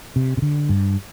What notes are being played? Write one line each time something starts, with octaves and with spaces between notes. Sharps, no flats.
C3
C3
D3
G2